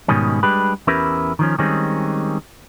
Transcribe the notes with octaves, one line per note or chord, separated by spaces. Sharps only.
G#2 B2 D#3 G3 C#4
G3 G#3 D4 G4 B4
E2 C#4 E4 G4 A#4 B4
D#3 F3 C#4
D#3 G3 G#3 C4 C#4